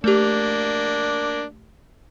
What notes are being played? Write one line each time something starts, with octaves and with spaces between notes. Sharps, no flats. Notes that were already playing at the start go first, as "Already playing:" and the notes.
A3 A#3 D4 G4